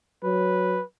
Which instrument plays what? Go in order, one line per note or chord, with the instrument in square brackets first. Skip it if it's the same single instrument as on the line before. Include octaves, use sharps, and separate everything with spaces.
[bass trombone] F#3 [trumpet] B4